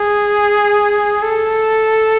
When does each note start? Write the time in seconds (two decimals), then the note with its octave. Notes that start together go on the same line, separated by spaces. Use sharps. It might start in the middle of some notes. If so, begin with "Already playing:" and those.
Already playing: G#4
1.23 A4